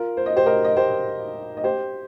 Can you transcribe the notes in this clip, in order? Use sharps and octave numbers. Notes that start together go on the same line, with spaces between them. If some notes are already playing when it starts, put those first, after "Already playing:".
Already playing: F4 A#4
C5
D#5
G4 C5
A#4 D#5
D#5
G4 C5
D#5
G4 C5